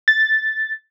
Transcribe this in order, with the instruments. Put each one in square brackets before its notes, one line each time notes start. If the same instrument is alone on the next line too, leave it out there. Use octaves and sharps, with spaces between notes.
[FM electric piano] A6